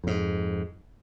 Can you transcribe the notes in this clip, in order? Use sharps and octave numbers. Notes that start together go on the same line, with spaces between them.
F2 G#2